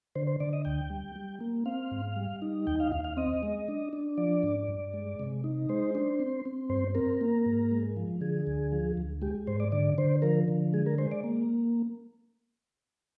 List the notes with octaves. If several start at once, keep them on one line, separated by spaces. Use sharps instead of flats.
D3 C5
C5
D3 D5
D#5
D2 G5
G3
G3
A#3
C4 F5
G#2
G3
D#4
D#2 G5
F5
D#2 F5
F5
C4 D#5
G#3
D4
D4
F3 D5
G#2
G2
G#3
C3
D#4
G#3 C5
D4
C4
C4
G2 C5
C4 A#4
A#3
G#2
G#3
F3
D3 G#4
D2
F3
D2
G#3 G4
G#2 C5
D5
D3 D5
D3 C5
F3 A#4
D3
G#3 G#4
A#4
G#3 C5
D5
A#3